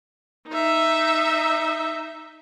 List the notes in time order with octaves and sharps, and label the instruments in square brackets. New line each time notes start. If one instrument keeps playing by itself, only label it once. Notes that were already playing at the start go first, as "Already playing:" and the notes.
[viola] D#4 E5